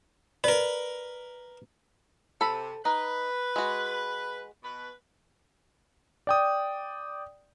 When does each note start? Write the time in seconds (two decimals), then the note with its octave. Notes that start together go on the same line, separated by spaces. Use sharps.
0.44 A#4 B4 D5
2.41 C3 A4 B5
2.85 D#4 B4
3.56 G#3 F#4
4.63 B2 B4
6.27 D5 G5 D#6